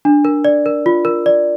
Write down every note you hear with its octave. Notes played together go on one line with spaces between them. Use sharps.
D4
A#4
D5
A#4
F4
A#4
D5